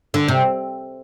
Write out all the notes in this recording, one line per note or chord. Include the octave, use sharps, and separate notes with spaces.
D3
C3